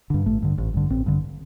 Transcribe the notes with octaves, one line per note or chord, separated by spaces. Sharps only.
G2 D3
A1 A3
G2 D3
A1
G2 D3
A1 C4
G2 D3